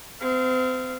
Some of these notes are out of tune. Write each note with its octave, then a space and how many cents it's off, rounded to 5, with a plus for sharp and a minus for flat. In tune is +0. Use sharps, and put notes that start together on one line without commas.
C4 -35 F5 -20